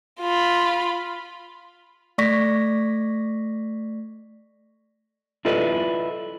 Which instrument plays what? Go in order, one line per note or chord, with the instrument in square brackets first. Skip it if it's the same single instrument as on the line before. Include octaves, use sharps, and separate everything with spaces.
[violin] F4 B5
[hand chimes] A3 D5 C#6 A#6 B6
[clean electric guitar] E4 F4 A4 B4 D5 D#5